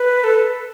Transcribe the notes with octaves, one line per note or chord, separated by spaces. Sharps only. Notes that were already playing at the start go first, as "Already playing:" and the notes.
Already playing: B4
A4